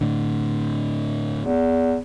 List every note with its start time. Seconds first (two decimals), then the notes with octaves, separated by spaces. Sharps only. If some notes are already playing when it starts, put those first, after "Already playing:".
0.01 A2 D3
1.40 E2